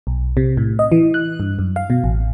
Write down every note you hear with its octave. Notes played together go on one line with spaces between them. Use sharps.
B1
C3
A2
D#5
E3
F#6
G2
F#2
F5
B2
A1